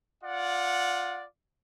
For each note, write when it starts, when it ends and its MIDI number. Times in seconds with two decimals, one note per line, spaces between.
0.24 1.24 65
0.24 1.24 74
0.24 1.24 78